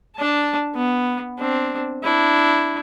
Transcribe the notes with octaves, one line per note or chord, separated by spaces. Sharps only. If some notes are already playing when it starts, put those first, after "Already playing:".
D4 A5
B3
C4 D4
D4 E4